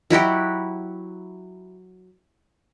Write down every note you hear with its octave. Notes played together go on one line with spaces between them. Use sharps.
F#3 E4 F#4 G4